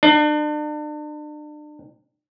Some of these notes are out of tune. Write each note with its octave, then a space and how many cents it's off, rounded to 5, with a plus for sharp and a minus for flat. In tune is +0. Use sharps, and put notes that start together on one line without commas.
D4 +35